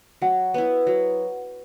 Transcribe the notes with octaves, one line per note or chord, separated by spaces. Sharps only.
F#3 F#5
B3 E4
F#3